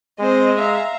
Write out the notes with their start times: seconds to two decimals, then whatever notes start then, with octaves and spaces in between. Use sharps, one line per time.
0.20 G#3 C4 C5 D#5
0.58 E5 F5 A#5